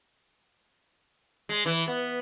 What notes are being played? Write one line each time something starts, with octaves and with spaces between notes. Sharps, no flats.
G#3
E3
B3